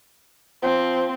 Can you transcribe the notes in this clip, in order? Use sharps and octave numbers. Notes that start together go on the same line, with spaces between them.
F3 C4